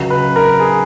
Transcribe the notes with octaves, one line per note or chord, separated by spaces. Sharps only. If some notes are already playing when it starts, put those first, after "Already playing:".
Already playing: C#2 C#3 F#3
B4
A#4
G#4